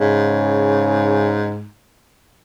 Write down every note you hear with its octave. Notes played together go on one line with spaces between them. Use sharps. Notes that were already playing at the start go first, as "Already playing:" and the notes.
G#2 C#3